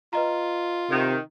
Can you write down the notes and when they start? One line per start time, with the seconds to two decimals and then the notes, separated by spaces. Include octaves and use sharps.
0.13 F4 B4 D#5 A#5
0.90 C3 D#3